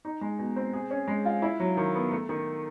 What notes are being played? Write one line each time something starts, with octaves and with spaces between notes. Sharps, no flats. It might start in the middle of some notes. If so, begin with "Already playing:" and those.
D#4
G#3
B2
C4
G#4
C#4
G#3
F4
E4
F#3
D#3
B3
A3
D#3